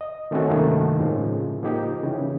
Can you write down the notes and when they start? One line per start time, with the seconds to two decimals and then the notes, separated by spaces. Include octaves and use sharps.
0.01 D#5
0.31 D#3 A3 C4 C#4 F#4 A4
0.48 G2 C3 D#3 A3 A#3 D4
1.00 A2 C#3 F3 G#3
1.63 F3 A#3 D#4 G4
2.03 C#3 E3